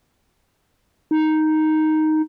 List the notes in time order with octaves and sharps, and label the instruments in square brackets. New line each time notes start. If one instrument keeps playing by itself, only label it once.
[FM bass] D#4